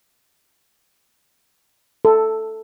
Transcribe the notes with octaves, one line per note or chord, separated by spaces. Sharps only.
A4